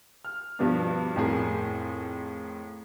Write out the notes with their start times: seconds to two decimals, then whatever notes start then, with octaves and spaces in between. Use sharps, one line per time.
0.25 F6
0.59 G2 B2 F3 G3 B3 D4
1.16 F2 A2 G#4 A#4